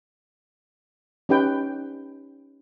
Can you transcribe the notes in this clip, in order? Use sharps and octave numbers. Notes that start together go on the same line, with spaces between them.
C#4 D#4 G4 B4 G5